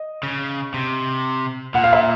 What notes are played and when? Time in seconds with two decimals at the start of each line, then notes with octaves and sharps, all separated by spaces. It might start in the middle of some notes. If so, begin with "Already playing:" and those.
Already playing: D#5
0.23 C#3
0.74 C3
1.74 A#2 F#5
1.84 F5
1.93 E5